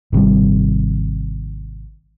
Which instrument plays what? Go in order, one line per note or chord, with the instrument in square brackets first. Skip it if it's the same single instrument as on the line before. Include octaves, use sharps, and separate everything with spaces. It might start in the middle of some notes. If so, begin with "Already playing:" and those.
[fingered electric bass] G#1 C3 D#3 G3